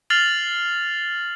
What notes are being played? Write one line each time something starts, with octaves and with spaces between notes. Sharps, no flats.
F6 A6 C7 F7 F#7